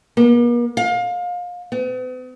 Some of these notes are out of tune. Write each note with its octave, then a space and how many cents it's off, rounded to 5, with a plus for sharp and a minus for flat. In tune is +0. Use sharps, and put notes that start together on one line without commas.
A#3 +45
F5 +30
B3 +45